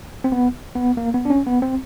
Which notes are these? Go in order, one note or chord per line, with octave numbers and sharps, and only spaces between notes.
C4
B3
B3
A#3
B3
D4
C#4
B3
C4